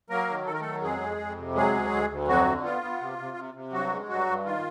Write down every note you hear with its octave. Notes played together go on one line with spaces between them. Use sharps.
F#3 A#3 A#4
D#3
D#3 A4
A#4
F#3 A3 A4
F2 G#3 G#4
F2
F2
C3
F#3 G#3 G#4
D2
D2
D2
F2 F#3 F#4
D3
B3 F4
B3
C3
C3
C3
C3
G2 F#3 F#4
G#3
G2 F#3 F#4
G2
D#3 F4